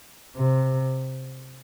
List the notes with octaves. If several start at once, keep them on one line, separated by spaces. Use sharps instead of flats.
C3